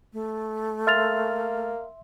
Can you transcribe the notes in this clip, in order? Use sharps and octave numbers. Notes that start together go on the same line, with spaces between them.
A3
A#3 E5 C6 F6 A6 F7